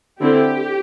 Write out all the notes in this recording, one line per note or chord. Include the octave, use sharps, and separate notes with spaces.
D3 C4 E4 G4